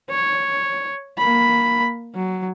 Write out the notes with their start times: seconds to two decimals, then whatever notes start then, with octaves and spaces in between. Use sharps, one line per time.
0.10 C#5
1.18 A#3 B5
2.15 F#3